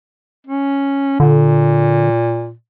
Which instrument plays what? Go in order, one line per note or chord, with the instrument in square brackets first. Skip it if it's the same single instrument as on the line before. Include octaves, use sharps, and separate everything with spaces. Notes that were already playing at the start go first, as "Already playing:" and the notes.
[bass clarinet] C#4
[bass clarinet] A#2 [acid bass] D3